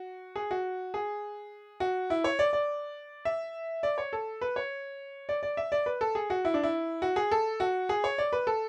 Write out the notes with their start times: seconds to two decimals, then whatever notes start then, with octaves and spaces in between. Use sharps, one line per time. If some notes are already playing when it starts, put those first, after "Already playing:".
Already playing: F#4
0.36 G#4
0.51 F#4
0.94 G#4
1.80 F#4
2.10 E4
2.24 C#5
2.39 D5
2.53 D5
3.25 E5
3.83 D5
3.98 C#5
4.13 A4
4.41 B4
4.56 C#5
5.29 D5
5.43 D5
5.57 E5
5.72 D5
5.86 B4
6.01 A4
6.15 G#4
6.30 F#4
6.45 E4
6.54 D4
6.63 E4
7.02 F#4
7.16 G#4
7.31 A4
7.60 F#4
7.89 G#4
8.04 C#5
8.18 D5
8.33 B4
8.47 A4